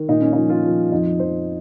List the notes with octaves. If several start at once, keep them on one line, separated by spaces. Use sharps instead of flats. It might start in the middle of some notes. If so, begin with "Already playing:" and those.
Already playing: D#3
A#2 D#4
C#4
D#4
F3
F4
F3
F2 D#4
F2 C5